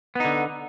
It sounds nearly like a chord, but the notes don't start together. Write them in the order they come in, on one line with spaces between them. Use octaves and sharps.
B3 D#4 D3